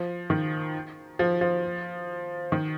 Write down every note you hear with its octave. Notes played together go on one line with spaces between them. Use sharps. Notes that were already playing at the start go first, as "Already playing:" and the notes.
Already playing: F3
D#3
F3
F3
D#3